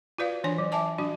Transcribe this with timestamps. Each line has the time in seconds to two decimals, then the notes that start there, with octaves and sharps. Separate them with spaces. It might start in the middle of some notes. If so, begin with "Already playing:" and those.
0.18 F4 F#4 B4 D5 F5
0.44 E3 D4 C#5 G#5
0.58 F#3
0.72 E5 G#5 A5 D6
0.98 F#3 D4 F#4